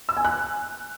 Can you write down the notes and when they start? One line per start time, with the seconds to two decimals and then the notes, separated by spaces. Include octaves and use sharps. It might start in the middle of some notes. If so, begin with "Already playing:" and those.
0.09 E6
0.17 G#5
0.25 F#6